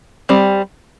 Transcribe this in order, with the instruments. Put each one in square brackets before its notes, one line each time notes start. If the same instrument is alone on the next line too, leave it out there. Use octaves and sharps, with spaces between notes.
[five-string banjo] G3 C4